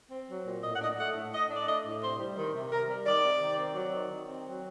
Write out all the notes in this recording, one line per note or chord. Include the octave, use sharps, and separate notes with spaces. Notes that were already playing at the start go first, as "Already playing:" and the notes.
C4
F#3
A#2
A2 D#5
F#5
D4 D#5
A3 F#5
A2
A2 D#5
D4
D5
A3 D#5
A2
C3 C5
G3
D#3
C3
C3 A#4
G3
D#3 D5
C3
D#3
C4
F#3
D#3
D#3
C4
F#3